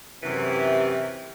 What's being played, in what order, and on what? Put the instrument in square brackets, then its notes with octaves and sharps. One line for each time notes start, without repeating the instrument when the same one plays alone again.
[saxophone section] F#2 E3 [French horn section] C3